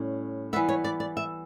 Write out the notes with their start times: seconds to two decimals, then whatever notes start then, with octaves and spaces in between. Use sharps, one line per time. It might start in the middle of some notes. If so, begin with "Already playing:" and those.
Already playing: A2 G3 C#4
0.53 E3 G3 B3 E5
0.69 C#5
0.84 D5
1.00 D5
1.17 E5